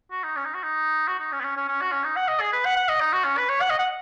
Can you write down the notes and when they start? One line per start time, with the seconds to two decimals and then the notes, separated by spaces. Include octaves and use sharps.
0.11 F#4
0.23 D#4
0.36 C#4
0.45 D#4
0.54 F#4
0.63 D#4
1.07 F#4
1.19 D#4
1.32 C#4
1.40 B3
1.44 C#4
1.57 C#4
1.68 C#4
1.81 F#4
1.92 C#4
2.04 D#4
2.16 F#5
2.28 D#5
2.40 G#4
2.52 B4
2.65 F#5
2.76 F#5
2.89 D#5
3.00 D#4
3.13 F#4
3.24 C#4
3.38 B4
3.49 C#5
3.61 F#5
3.70 D#5
3.79 F#5